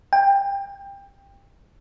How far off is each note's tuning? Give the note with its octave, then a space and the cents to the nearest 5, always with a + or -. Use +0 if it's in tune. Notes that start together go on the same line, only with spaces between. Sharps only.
G5 +20